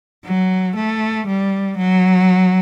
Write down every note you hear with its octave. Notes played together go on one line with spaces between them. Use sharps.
F#3
A3
G3
F#3